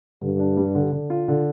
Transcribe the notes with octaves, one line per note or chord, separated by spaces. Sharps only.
G2 D3
D4
G3
D3
D3
F4
D3